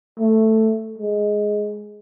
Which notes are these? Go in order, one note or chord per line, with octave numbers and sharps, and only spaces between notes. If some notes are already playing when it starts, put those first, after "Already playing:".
A3
G#3